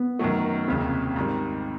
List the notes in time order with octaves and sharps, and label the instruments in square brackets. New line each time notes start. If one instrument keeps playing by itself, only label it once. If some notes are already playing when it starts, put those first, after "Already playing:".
Already playing: [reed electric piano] B3
[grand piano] F#2 D#3 F#3 A3
[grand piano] F1 D#2 C#3 [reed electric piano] C4
[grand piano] G#2 D#3 G3